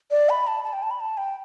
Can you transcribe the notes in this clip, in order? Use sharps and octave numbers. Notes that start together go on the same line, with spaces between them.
D5
B5
A5
A5
G5
A5
B5
A5
G5